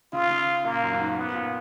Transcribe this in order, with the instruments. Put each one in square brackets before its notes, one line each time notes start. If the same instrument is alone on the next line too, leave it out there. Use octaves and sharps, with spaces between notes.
[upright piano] C#3 [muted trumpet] F4
[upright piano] C#3
[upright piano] A#2 [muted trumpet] A#3
[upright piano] F#2
F#2
G#2
[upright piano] G#2 [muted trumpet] B3
[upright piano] A#2